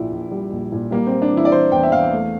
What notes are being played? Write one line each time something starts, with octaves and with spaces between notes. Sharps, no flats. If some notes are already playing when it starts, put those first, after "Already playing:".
Already playing: A#1 A#2 E4
A#1
G3
A#1
A#2
G3 A#3
G3 C4
D4
E3
E4
D5
E3 C5
E2 G5
E5
E2 F5
A3